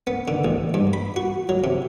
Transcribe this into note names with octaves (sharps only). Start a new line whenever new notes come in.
B3
D3
A1
G2
B5
F#4
F#3
C3